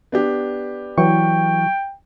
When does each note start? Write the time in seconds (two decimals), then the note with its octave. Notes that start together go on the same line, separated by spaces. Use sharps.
0.12 B3 D4 G4
0.98 E3 F#3 G5 C#6